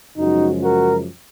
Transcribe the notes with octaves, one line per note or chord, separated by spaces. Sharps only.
F#2 C#3 F3 G#3 D#4 F#4
F#4 A#4